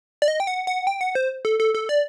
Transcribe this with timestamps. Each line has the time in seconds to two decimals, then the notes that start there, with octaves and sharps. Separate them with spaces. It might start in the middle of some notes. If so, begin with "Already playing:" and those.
0.22 D5
0.28 D#5
0.40 G5
0.47 F#5
0.67 F#5
0.87 G5
1.01 F#5
1.15 C5
1.45 A4
1.60 A4
1.75 A4
1.89 D5